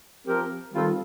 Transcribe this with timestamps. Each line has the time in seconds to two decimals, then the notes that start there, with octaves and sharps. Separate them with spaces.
0.26 F3 C4 G4 A#4
0.72 D#3 G3 C4 F4 A4